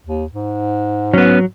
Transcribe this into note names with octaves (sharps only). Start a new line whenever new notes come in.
D#2
G#2
F#3 B3 C#4